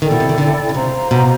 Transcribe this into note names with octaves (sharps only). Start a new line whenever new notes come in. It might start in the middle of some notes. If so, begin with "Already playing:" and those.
D#3 E4 A4 D5 G5
B2
C3
D#3
D3
C#3
C3 C5 F5 A#5
B2